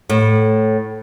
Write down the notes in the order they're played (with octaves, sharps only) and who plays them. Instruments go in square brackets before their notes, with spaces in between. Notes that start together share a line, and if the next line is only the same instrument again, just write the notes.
[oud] A2